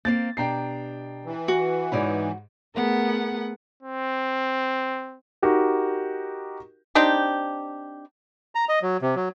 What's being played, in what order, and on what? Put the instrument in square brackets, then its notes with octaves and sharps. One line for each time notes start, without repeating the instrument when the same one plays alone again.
[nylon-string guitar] A#3 C4 F5 [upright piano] A6
[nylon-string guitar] B2 D4 G4 [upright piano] G5 A#5 C7
[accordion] E3
[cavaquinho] F#4
[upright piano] G#2 B5 [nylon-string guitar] D#4 C#5 D5
[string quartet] A3 B3 G#4 A#4 F#5
[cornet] C4
[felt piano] D#4 F#4 G4 A#4
[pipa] C4 D4 D#4 G4
[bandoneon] A#5
D#5
F#3
C3
F#3